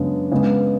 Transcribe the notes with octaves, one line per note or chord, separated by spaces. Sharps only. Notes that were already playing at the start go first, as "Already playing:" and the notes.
Already playing: F#2 C#3 G#3 B3 D4
C#3 G#3 B3